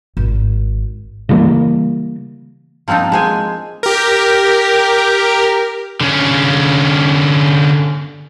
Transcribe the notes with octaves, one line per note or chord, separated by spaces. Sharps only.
G#1
C#3 E3 G3 A#3
F3 A#3 C4 D4 D#4
G#3 C5 G#5
G4 A#4
D3 C#4